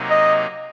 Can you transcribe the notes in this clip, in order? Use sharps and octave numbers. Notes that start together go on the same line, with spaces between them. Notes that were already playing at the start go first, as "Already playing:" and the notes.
Already playing: C3 F#3 A#3 D#4
D#5